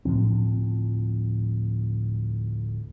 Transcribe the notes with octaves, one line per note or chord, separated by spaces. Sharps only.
D2 A2 F3 C4